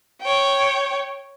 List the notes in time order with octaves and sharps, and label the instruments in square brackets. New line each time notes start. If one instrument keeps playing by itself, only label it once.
[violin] C#5 G5